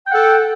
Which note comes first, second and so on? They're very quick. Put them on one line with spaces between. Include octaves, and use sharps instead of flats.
G5 F#5 A4